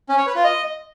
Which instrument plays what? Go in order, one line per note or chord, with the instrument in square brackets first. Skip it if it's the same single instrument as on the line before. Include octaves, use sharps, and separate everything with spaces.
[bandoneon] C#4
C#5
B4
F4
D#5